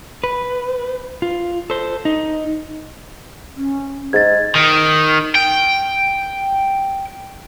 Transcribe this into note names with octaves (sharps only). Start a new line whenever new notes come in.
B4
F4
A4 C5
D#4
C#4
G#2 D#5 G#6 A6
D#3
G5